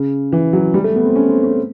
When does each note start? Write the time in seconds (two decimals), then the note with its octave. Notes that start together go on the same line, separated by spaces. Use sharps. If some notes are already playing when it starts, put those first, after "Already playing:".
Already playing: C#3
0.32 E3
0.53 F#3
0.74 G3
0.84 A3
0.96 B3
1.05 C4
1.16 C#4
1.29 C4
1.44 C#4